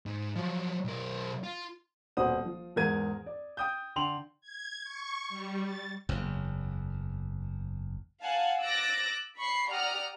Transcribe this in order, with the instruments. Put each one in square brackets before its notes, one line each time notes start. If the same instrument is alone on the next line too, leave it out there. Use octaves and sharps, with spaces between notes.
[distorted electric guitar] G#2
F3 F#3
B1 A#4
F4
[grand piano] D#1 B2 C5 F#5 D#6
F3
E2 G#2 A#4 G#6 D#7
D5
G5 D#6 G6
D3 G5 C6 F7 F#7
[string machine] G#6
C#6
G3
A6
[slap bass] F#1 E2
[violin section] F5 F#5 G#5 A5
D6 E6 F#6 A6 A#6 D7
B5 C#6 C7
G4 D5 F#5 A#5 D#6 F6